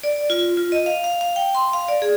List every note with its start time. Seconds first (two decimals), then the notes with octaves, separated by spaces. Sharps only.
0.04 D5
0.30 F4
0.57 F4
0.72 D#5
0.86 F5
1.04 F5
1.21 F5
1.36 G5
1.55 C6
1.73 F5
1.88 D5
2.02 G#4